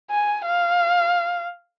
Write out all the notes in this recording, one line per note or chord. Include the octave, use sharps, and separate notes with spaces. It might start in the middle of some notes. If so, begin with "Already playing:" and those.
G#5
F5